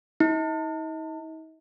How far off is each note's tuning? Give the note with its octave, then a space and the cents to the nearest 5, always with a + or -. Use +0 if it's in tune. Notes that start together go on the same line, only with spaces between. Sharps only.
D#4 +40